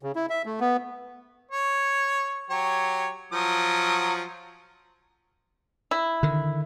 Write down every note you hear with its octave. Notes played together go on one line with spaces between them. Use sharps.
C#3
E4
E5
A3
B3
C#5
F#3 G4 C#5
F3 F#3 D#6
E4
D3 D#3